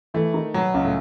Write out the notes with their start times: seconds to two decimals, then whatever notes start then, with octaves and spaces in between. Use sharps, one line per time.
0.14 E3 A3 E4
0.34 D#3 D#4
0.54 B2 F#3 B3
0.74 C#2 C#3
0.85 A2